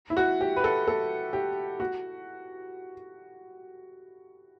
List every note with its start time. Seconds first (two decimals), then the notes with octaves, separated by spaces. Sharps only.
0.10 E4
0.17 F#4
0.41 G4
0.56 B4
0.64 A4
0.88 A4
1.33 G4
1.80 F#4